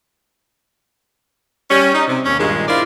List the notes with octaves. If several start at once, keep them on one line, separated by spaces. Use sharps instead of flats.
G3 C#4
D#4
C3
D#2 C#4
G2 A#2 D#3 G#3
E4 F4 A#4 C5 D5